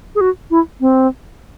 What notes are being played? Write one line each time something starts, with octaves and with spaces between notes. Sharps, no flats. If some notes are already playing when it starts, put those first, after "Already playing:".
G#4
F#4
E4
C4